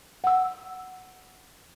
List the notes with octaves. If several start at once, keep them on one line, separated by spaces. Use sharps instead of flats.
F#5 E6